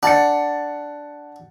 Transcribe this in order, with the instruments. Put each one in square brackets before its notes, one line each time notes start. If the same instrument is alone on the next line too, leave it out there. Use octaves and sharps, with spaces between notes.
[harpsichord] D4 [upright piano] F#5 A6 C#7